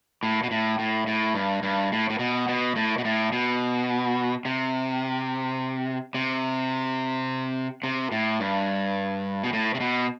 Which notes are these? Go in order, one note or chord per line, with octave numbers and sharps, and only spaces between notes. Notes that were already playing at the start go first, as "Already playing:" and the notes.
A2
B2
A2
A2
A2
G2
G2
A2
A2
B2
B2
A2
B2
A2
B2
C3
C3
C3
A2
G2
B2
A2
C3
B2